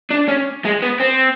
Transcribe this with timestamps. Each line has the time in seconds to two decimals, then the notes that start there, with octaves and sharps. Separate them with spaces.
0.10 D4
0.28 C#4
0.65 G#3
0.82 B3
1.00 C4